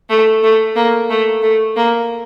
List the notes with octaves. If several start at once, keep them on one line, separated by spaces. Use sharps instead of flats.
A3
A3
A#3
A3
A3
A#3